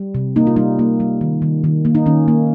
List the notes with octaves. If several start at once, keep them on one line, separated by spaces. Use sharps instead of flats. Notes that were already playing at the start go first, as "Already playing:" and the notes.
Already playing: G3
C3
A#3 D#4
F4
G3 D#4
A#3
G3
D#3
D#3
D#3
A#3
D#4
D#3 C#4
A#3